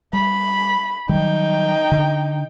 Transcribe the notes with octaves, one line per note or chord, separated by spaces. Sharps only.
G3 B5
D#3 F#3 G3 D#4 G5
D3